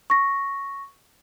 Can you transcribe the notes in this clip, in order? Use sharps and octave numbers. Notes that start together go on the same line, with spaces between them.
C#6 A#6